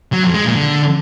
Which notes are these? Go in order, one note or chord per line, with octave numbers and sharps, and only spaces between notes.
F#3
F2
G#3
A#2
D3